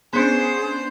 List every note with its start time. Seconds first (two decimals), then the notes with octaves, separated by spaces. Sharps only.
0.13 B3 C#4 D4 G#4 C5